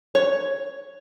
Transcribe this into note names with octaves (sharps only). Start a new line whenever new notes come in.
C#5